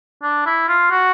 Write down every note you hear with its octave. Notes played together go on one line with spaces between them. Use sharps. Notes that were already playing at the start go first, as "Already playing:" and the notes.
D4
E4
F4
F#4